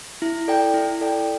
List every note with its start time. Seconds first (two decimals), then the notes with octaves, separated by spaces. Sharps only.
0.22 E4
0.48 A4 D5 G5
0.74 E4
1.01 A4 D5 G5